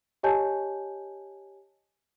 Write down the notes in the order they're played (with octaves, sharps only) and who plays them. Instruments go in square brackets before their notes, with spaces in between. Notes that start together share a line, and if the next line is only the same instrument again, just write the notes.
[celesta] G4 C#5 D#5 G#5 A5 G6